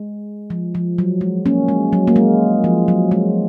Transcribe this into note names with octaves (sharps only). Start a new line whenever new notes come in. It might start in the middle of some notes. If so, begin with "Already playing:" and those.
Already playing: G#3
F3
F3
F#3
G#3
A#3 C#4
G#3
F#3
A#3
G#3
F3
F#3
G#3